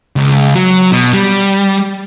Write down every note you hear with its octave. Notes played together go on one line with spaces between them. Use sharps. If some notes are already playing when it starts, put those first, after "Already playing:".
C#2
F#3
B2
G3